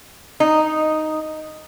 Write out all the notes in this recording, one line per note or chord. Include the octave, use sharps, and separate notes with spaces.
D#4